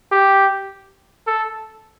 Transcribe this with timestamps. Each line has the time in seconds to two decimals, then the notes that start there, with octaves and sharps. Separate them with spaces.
0.12 G4
1.27 A4